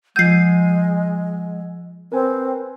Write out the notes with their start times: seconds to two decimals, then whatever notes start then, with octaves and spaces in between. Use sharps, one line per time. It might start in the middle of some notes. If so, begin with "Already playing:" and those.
0.16 F3 G#3 F#5 E6 G6 G#6 C7 D#7
2.12 C4 A#4 B4 G#5